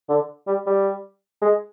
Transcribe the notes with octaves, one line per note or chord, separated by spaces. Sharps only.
D3
G3
G3
G#3